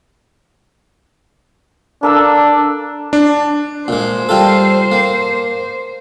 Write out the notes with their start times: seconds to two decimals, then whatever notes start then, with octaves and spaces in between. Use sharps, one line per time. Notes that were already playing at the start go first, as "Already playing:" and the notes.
2.03 A#3 D4 A4 E6
3.13 D4
3.88 A#2 G#3 C5
4.29 G3 F4 A4
4.92 A#3